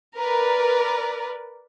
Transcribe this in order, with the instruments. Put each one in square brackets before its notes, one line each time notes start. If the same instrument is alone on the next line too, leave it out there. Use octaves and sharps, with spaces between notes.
[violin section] A#4 B4 D5